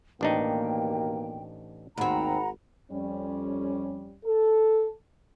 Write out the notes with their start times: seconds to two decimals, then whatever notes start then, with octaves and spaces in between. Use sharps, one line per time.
0.21 A1 D#2 B2 A#3 D4 D#4 G5
1.97 G#1 D#2 C4 F#5 A#5 B5
2.90 F2 G3 C#4
4.25 A4